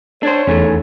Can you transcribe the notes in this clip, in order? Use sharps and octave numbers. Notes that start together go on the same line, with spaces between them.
D4 C5 C#5
E2 D#3 A3 C#4